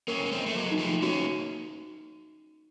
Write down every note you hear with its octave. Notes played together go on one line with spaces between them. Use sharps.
A#3 C#4 A#4
C#4
A3 C4
D#5
A3
F#3 A#3
D#4
F3 A3
A#3 C#4 F#4